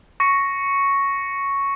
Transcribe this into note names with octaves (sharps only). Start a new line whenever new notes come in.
C#6 A#6 C#7